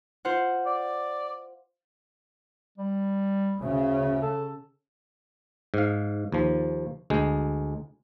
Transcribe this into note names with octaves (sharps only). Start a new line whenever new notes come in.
F4 C5 F#5
D5
G3
D2 C#3
A4
G#2 F5
D#2 F3
D2 G#3